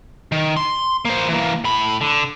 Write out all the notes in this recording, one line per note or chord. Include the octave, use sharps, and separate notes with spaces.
D#3
C6
A#3 C5
E3 A#3
A2 B5
D3